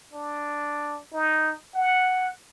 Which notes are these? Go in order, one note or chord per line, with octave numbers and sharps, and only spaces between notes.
D4
D#4
F#5